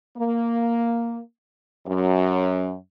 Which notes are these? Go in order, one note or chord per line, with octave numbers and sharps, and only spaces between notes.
A#3
F#2